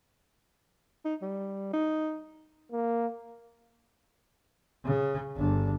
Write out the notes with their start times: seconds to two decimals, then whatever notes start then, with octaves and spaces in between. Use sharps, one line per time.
1.05 D#4
1.22 G3
1.73 D#4
2.72 A#3
4.85 C#3
5.37 G1 D4